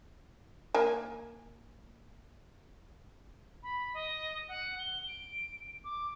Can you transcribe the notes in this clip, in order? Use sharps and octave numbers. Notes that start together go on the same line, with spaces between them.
A#3 G#5
B5
D#5
F#5
G7
D7
D6